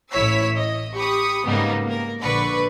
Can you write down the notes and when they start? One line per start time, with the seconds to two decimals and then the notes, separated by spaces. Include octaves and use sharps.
0.11 A1 E4 C#5 E6 B6
0.57 D#5
0.94 G4 B5 C#6 D#6
1.46 G#2 C#3 G3 A#3 B3 D#4
1.85 A#3 A#4
2.21 A#1 D3 B4 D5 C#6